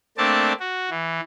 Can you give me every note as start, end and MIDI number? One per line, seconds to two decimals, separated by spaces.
0.18 0.53 57
0.18 0.53 58
0.18 0.53 60
0.18 0.53 62
0.18 0.53 74
0.18 0.53 81
0.60 0.90 66
0.90 1.20 52